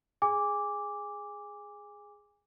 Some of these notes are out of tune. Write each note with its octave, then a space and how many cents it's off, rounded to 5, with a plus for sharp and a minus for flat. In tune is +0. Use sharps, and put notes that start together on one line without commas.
G#4 +0 G#5 -25 D6 -5